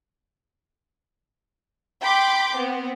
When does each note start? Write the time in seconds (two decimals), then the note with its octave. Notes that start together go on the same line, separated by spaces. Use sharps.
2.03 G5 B5 C6 D6 G6
2.57 B3 C4